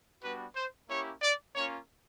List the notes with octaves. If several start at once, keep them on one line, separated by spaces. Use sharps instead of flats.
G3 B3 D4 F#4 B4
C5
A#3 C#4 E4 G4 C#5
D5
A#3 C#4 F4 C#5